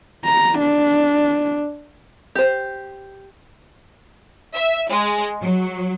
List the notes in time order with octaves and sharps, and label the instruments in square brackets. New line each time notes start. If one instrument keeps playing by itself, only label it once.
[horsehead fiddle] A#5
D4
[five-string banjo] G4 C5
[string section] E5
G#3
F#3